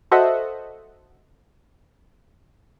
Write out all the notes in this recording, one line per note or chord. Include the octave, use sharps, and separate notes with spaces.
F#4 A4 C5 D#5 E5 F#5